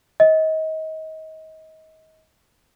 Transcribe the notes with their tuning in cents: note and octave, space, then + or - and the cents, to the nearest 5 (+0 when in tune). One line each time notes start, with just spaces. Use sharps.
D#5 +30